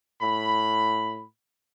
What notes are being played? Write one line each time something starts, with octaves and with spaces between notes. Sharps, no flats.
A2 B5